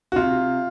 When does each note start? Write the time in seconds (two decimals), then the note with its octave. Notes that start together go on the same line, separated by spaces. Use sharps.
0.12 F#4
0.16 C3 F4